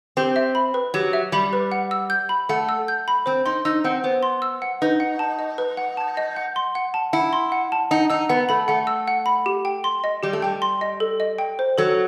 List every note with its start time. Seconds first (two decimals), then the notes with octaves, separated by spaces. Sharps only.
0.17 C4 G4
0.36 E5
0.55 B5
0.74 B4
0.94 F#3 G4
1.13 E5
1.32 G3 B5
1.53 B4
1.72 F#5
1.91 E6
2.10 G6
2.29 B5
2.49 A3 F#5
2.69 E6
2.88 G6
3.08 B5
3.26 C4 C5
3.46 D#4 C6
3.65 D#4 E6
3.84 C4 F#5
4.04 B3 C5
4.23 C6
4.42 E6
4.62 F#5
4.82 D#4 B4
5.00 F#5
5.19 A5
5.39 D#5
5.58 B4
5.77 F#5
5.97 A5
6.17 D#5
6.36 F#5
6.56 C6
6.75 F#5
6.94 A5
7.13 E4 F#5
7.33 C6
7.52 F#5
7.72 A5
7.91 D#4 F#5
8.10 D#4 E6
8.29 B3 F#5
8.49 A3 B5
8.68 A3 F#5
8.87 E6
9.07 F#5
9.26 B5
9.46 G4
9.65 G5
9.84 C6
10.04 D#5
10.23 G3 G4
10.33 A3
10.42 G3 G5
10.62 C6
10.81 D#5
11.00 A4
11.20 D#5
11.38 G5
11.59 C5
11.78 F#3 A4